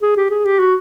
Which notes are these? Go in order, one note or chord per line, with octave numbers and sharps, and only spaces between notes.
G#4
G4
G#4
G4
F#4